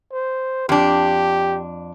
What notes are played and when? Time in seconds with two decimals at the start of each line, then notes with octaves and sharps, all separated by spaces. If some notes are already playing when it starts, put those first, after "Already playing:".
0.12 C5
0.69 F2 D4 G4